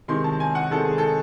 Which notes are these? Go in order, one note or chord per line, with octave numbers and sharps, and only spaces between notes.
C3 D#3 G#3 C6
A5
G#5
F#5
C3 D#3 G#3 A4
G#4
A4